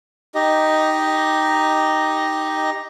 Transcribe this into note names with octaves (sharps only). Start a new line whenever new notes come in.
D#4 G4 D#5